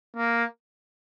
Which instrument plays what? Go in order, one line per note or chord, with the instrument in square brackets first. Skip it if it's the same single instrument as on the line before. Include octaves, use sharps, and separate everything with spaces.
[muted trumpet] A#3